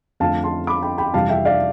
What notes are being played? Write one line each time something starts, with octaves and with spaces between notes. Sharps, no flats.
F2 D3 F3 A3 F5 A5
A5 C6
B5 D6
G5 B5
G5 B5
F2 C3 E3 G3 F5 A5
E5 G5
D5 F5